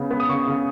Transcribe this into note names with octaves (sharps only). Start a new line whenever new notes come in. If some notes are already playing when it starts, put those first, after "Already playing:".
Already playing: C#3 B3
B3
D#6
C#3 C#6
C#3